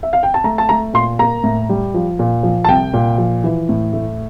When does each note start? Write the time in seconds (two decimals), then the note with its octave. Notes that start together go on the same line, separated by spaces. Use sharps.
0.03 E5
0.13 F5
0.23 G5
0.34 A5
0.44 A3 A#5
0.58 A5
0.69 A3 A#5
0.94 A#2 C6
1.19 A#3 A#5
1.43 A2
1.69 G3
1.94 F3
2.19 A#2
2.43 F3
2.64 A5
2.68 C2 G5
2.94 A#2
3.18 F3
3.44 E3
3.69 A2
3.93 A3